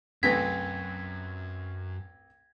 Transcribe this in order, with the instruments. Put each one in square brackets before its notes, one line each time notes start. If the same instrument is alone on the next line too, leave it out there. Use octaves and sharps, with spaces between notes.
[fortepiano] C2 E3 A3 [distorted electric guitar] F#2 [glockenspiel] G#6 A#6 [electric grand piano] B6